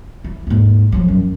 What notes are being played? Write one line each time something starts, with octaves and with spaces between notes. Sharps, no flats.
E3
D#2 G#2
F3 F#3
F#2